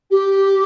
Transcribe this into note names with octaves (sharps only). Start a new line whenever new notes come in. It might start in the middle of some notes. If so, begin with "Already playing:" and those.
G4